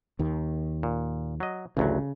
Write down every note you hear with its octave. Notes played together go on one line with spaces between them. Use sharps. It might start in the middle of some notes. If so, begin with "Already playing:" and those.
D#2 D#3
A#2
F#3 D#5
A1 D2 C#3 F#3